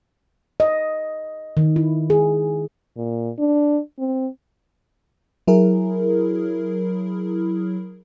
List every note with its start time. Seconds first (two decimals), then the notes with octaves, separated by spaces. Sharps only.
0.60 D#5
1.57 D#3
1.76 E4
2.10 G#4
2.97 A#2
3.38 D4
3.99 C4
5.47 F#3 E4 G#4 A#4